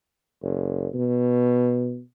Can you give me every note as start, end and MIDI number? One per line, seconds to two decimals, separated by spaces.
0.42 0.87 30
0.94 2.00 47